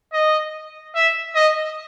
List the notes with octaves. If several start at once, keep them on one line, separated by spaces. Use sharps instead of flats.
D#5
E5
D#5